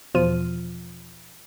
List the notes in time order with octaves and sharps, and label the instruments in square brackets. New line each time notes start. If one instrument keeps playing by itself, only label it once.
[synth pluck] E2 B2 F3 F4 F6 D#7